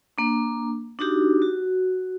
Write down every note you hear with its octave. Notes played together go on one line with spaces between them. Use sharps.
A#3 D4
D4 D#4 F#4 G4
F#4